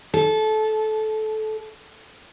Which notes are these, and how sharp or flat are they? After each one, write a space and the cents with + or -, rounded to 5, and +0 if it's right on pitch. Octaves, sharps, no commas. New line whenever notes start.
A4 -20